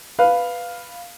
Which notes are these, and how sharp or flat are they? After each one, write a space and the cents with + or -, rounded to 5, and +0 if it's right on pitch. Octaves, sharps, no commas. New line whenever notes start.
B4 +0 F5 +0